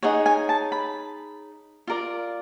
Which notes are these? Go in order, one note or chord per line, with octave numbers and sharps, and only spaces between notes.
D#4 G#4 C#5 F#5
G#5
A5
B5
F4 A#4 D5